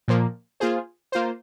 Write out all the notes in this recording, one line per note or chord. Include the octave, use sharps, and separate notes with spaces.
A#2 F3 A#3
A#3 F4 G#4 C5
A#3 F4 C5